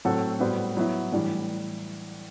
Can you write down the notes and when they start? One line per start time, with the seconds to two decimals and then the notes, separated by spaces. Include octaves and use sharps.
0.05 A2 F#3 C4 F#4 A4
0.40 A2 G3 B3 F#4 C5
0.77 F#3 B3 E4
1.12 A2 E3 G3 D4